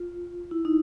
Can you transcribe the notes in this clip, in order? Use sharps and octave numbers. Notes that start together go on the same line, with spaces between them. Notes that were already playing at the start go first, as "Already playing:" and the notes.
Already playing: F4
E4
D#4